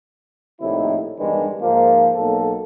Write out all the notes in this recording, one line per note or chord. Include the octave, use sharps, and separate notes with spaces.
A#1 A2 C3 D#3 D#4 E4
E2 G2 D#3 G#3 D4 B4
G#2 F3 A#3
B1 A#3 A4